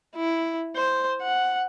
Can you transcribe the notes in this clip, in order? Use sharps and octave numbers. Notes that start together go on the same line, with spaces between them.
E4
C5
F#5